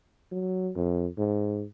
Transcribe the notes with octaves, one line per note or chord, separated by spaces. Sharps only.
F#3
F2
G#2